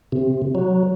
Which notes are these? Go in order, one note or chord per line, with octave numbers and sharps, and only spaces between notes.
C3
F#3